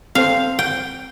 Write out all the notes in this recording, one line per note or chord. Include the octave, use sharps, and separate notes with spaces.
C4 A4 C5 F5
G5